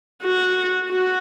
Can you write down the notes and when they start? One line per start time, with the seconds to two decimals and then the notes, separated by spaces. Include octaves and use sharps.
0.22 F#4
0.90 F#4